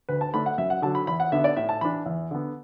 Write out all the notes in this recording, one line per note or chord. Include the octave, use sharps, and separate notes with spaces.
D2 B4
A5
D3 A3 D4 B5
F#5
F#2 E5
F#5
D3 F#3 A5
B5
E2 B5
F#5
D3 B3 D4 E5
D5
A2 E5
A5
E3 D4 B5
E2
D3 B3